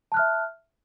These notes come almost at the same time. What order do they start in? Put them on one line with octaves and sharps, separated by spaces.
A5 F#6 F6 E5